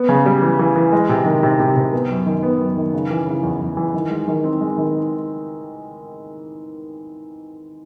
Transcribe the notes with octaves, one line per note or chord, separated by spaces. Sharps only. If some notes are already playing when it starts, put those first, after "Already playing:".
Already playing: B3
C#3
G3
E3
E3
E3
G#3
C3
D#3
C3
C3
C3
B3
F#2
D#3
B3
F#2
D#3
C#3
E3
C#3
E2
E2
E3
D#3
G#3
D#3
C4
G#3
D#3